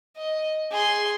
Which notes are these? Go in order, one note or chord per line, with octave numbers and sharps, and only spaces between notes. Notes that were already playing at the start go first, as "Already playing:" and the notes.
D#5
G#4 C6